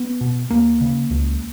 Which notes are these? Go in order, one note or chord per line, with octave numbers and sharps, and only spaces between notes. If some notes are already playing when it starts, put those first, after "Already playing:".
Already playing: B3
B2
D#2 A#3
C#3
C#2